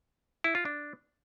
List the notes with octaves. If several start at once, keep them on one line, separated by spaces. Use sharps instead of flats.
E4
F4
D4